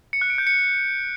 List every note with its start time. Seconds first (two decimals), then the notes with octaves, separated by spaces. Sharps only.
0.13 C#7
0.21 F#6
0.30 D7
0.38 G6
0.47 C#7